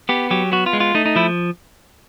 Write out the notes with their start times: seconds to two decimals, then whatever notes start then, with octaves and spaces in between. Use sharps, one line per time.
0.09 B3 G4
0.31 F#3 G4
0.52 B3 F#4
0.66 F4
0.73 G#3
0.80 F4
0.94 A3 D#4
1.06 D#4
1.16 F3 E4